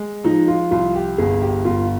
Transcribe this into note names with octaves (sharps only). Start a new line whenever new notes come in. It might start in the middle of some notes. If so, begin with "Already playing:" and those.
Already playing: G#3
F3 D#4
F4
C2 F4
G4
G1 G#4
G4
G1 F4